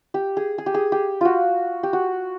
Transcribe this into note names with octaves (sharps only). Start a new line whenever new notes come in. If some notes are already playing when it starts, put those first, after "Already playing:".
G4
G#4
G#4
G4
G#4
G4
F4 F#4
G4
F#4